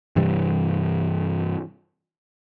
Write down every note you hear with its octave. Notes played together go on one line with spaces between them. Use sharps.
G2 C3 E3 G3